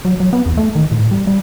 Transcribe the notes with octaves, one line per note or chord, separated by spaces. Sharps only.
F#3
F#3
B3
E2
A3
D#3
A2
G3
G3